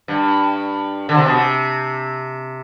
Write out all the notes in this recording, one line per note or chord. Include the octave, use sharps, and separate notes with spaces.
G2
D3
C3
B2
C3